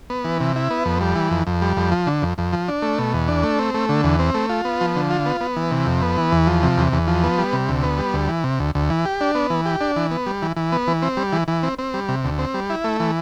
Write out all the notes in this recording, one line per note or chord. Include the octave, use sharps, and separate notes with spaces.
B3
E3
C3
E4
B3
F2
G3
E3
F2
F2
G3
F2
F3
D3
F2
F2
F3
D4
A3
B2
E2
D4
A3
C4
A3
D3
E2
C4
A3
F4
B3
F3
D3
F4
B3
B3
E3
C3
F2
B3
E3
E2
F3
C3
E2
E2
F3
B3
G3
C3
D2
B3
G3
D2
E3
C3
D2
D2
E3
G4
D4
B3
E3
G4
D4
E3
B3
G3
E3
E3
B3
E3
C4
G3
E3
E3
C4
C4
G3
C3
D2
C4
G3
E4
A3
E3